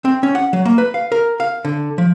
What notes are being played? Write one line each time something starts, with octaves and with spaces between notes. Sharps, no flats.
C4
C#4
F#5
F#3
A#3
B4
F5
A#4
F5
D3
F3